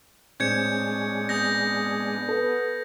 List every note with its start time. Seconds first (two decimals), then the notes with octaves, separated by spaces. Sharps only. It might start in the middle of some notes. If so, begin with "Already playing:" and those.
0.40 A2 G#3 C4 D4 C#5 G6 G#6 C#7
1.29 B3 D#6 G6 A#6
2.29 A4 B4